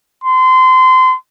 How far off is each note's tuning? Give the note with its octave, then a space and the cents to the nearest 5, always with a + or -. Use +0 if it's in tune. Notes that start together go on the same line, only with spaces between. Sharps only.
C6 -25